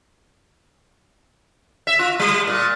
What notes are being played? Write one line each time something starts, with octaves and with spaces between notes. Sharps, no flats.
E5
F4
G3
A#2